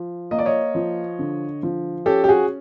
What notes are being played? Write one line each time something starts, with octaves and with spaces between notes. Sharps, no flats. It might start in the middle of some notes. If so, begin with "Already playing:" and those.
Already playing: F3
A#3 D#5
D5
C#5 D#5
F3
D3
F3
C#4 G4 A4
G4
F#4 G#4